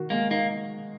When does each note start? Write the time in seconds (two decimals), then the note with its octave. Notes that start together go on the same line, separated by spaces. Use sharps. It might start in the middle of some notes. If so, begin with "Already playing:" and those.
Already playing: D#3 F#4
0.10 G#3 A#3
0.31 A#3 D#4